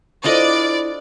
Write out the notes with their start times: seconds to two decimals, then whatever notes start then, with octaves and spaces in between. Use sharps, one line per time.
0.24 D4 E4 F4 A4 C5 D5 D#5